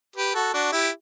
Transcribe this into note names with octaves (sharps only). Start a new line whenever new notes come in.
G4 B4
F#4 A4
D4 F#4
E4 G4